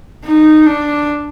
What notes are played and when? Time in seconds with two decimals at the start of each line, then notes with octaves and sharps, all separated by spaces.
0.24 D#4
0.66 D4